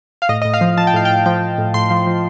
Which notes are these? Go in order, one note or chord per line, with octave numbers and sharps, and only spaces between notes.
F5
A2 D#5
A2 D#5
F5
F3
F3 A5
G5
A2 F5
G5
A2
F3 G5
F3
A2
A2 C6
F3
F3